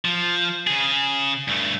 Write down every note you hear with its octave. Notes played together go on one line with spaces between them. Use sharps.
F3
C#3 G#4
G2 A3